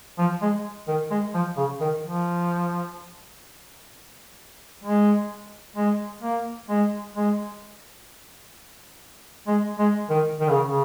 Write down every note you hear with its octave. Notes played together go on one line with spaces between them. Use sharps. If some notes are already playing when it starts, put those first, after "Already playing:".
F3
G#3
D#3
G#3
F3
C#3
D#3
F3
G#3
G#3
A#3
G#3
G#3
G#3
G#3
D#3
D#3
C#3
C#3